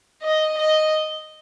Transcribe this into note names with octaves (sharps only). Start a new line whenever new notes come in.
D#5
D#5